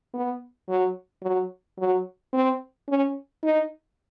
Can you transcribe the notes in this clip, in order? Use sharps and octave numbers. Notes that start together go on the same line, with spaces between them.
B3
F#3
F#3
F#3
C4
C#4
D#4